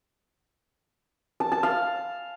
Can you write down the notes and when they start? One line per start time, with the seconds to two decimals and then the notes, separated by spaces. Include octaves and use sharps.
1.40 A5
1.52 A5
1.63 F5